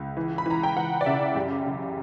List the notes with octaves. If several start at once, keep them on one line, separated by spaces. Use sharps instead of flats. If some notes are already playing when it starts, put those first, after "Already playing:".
Already playing: C#2
E3
B5
E3 A#5
G5
E3 F#5
D5
C#3 E5
F#2 G4
C#3